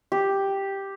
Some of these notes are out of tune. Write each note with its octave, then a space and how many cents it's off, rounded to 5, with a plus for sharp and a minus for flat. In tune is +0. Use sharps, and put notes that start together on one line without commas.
G4 +0